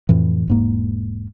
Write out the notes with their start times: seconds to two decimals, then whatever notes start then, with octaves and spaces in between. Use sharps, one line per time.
0.09 F2 A2 E3
0.48 E1 G#2 A#3